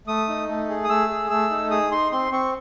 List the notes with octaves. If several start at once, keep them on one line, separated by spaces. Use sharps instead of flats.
A3 D#6
D#4
A3
G#4
D#6
A3 E6
G#4
A3 E6
D#4
G#4 D#6
D#4 C6
C4 C6
C4 C#6